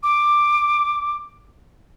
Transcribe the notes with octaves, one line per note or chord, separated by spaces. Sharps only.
D6